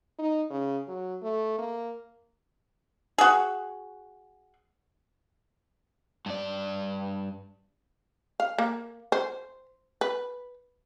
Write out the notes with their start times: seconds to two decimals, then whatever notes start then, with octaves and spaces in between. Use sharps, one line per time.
0.19 D#4
0.50 C#3
0.87 F#3
1.22 A3
1.59 A#3
3.18 F#4 G#4
6.26 G2 D5
8.40 F5
8.58 A#3
9.12 C5
10.01 B4